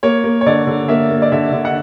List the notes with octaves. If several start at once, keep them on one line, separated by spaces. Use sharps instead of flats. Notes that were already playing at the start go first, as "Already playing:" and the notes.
A#3 C#5
A#3
C#5
D3 D5
D3
A#3 E5
A#3
D5
D3 E5
D3
F#5